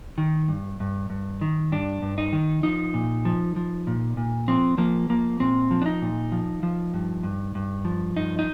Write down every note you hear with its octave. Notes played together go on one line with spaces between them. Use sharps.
D#3
G2
G2
G2
D#3
G2 D4
G2
D#4
D#3
F3 D#4
A#2
F3
F3
A#2
A#2
F3 C4
F3 A#3
F3 A#3
A#2 C4
F3
D4
D#4
A#2
F3
F3
G2
G2
G2
F3
G2 D#4
D#4